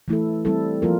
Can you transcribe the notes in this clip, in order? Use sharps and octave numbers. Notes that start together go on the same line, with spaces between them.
E3 A3 E4 A4
G3 C4 E4 A4
F3 A#3 F4 A#4